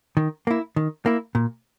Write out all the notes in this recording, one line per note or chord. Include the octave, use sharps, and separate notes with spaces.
D#3
A#3 E4
D#3
A#3 E4
A#2